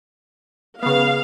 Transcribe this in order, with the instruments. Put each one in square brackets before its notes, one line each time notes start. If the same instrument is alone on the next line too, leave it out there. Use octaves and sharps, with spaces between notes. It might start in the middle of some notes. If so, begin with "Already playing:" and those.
[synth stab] C#3 B3 [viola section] F5